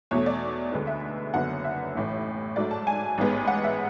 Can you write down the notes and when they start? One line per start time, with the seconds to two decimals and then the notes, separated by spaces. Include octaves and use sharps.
0.11 E2 B2 A3 C#5
0.26 D5
0.72 D2 D3 G#3 B3
0.87 E5
1.34 F#1 F#2 D3 F#3 B3 F#5
1.64 E5
1.95 A1 A2 E3 A3
2.56 G#2 F#3 A3 D5
2.71 A5
2.87 G#5
3.18 A1 G#2 G#3 B3
3.47 F#5
3.64 E5